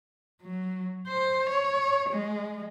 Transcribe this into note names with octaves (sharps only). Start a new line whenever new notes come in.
F#3
C5
C#5
G#3